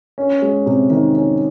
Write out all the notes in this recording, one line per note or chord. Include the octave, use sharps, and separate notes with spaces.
C#4
G#3
C3
D#3
C#4